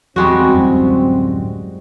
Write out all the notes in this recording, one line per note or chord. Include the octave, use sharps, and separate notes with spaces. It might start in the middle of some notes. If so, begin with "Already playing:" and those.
E2 G3 G#3 C4 F#4
D1 F#2 A2